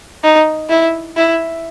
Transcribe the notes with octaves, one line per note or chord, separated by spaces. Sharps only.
D#4
E4
E4